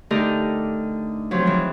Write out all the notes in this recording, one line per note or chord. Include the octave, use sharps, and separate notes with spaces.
D3 A3 D#4 G4 A#4 D#5
C3 F3 F#3
E3 G#3